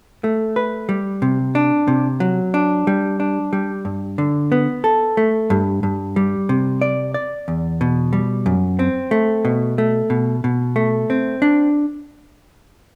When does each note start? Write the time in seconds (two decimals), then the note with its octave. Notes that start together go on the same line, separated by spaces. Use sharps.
0.24 A3
0.56 B4
0.89 G3
1.22 C3
1.55 D4
1.88 C3
2.20 F#3
2.54 D4
2.87 G3
3.20 D4
3.53 G3
3.85 G2
4.18 D3
4.52 B3
4.84 A4
5.17 A3
5.50 G2
5.83 G2
6.16 G3
6.49 C3
6.81 D5
7.14 D5
7.48 E2
7.81 B2
8.13 G3
8.46 F#2
8.79 C4
9.11 A3
9.45 B2
9.78 A3
10.10 B2
10.44 B2
10.76 A3
11.10 C4
11.42 D4